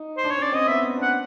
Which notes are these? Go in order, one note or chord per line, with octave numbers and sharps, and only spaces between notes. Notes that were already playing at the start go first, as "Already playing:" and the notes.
Already playing: D#4
C5
D4
C#5
C#4
D5
C4
D#5
B3 E5
D4 F#5